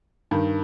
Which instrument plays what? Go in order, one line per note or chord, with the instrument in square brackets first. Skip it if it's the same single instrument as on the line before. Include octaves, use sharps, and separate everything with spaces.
[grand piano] G2 D#3